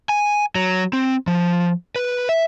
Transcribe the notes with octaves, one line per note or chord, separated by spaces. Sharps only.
G#5
F#3
C4
F3
B4
E5